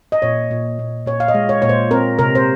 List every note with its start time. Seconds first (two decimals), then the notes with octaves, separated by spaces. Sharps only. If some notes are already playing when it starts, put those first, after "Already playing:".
0.12 D#5
0.22 A#2 C#5
0.51 A#2
0.79 A#2
1.06 A#2 C#5
1.20 F5
1.28 D#5
1.34 G#3
1.49 C#5
1.62 A#2 C#5
1.69 C5
1.91 C4 A#4
2.19 C3 A#4
2.35 C5